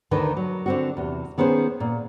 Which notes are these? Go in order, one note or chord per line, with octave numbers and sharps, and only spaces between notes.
D2 D3 D#3 A#4 B4
F#3
D3 C4 F#4
E2 C3
D#3 B3 C#4 G#4 C5
A#2